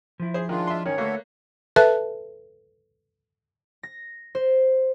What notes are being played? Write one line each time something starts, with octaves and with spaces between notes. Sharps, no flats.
F3 E4
G#4 C5
D#3 G#3 D4 F4
E5 C6
G#2 D#3 C#4 C#5
D3 A3 A#3 F#4 A4 B4
A4 B4 E5 A5 F#6
A#6
C5